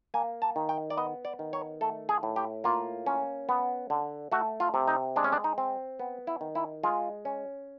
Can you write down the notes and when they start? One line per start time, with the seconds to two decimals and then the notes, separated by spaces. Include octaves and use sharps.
0.14 A#3 G#5
0.42 A5
0.56 D#3
0.69 G5
0.90 D5
0.97 B3 D#5
1.25 D5
1.39 D#3
1.53 C#5
1.81 A3 A4
2.09 G#4
2.23 A2
2.36 G4
2.64 A#3 F4
3.06 C#4
3.49 B3
3.90 D3
4.32 A3 F#4
4.60 F4
4.74 C3
4.88 D#4
5.16 G#3 D4
5.24 C#4
5.32 D4
5.44 D#4
5.58 C4
5.99 B3
6.27 E4
6.41 D#3
6.55 E4
6.83 G#3 F4
7.25 C#4